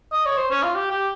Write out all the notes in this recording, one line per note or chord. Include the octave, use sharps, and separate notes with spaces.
D#5
C#5
C5
C#4
F4
G4
G4